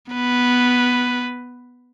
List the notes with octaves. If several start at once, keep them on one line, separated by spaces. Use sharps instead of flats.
B3 B4